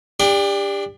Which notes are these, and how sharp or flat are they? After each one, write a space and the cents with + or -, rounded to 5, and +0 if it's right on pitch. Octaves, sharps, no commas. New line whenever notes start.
D4 +0 G4 +30